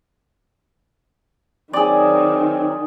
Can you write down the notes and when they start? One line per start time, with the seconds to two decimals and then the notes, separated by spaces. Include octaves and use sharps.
1.73 D#3 F#3 C4 G#4 D5